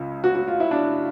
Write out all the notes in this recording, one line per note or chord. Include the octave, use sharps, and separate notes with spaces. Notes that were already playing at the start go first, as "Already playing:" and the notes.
Already playing: C#2 C#3
F#4
F#4
F4
E4
D4